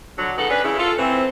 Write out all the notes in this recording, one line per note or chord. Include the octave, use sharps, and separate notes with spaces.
D3 F#3
C#3 B3 D#4 A4 F#5
C#4 D4 B4
C#3 E4
F4 A4
E3 A3 C4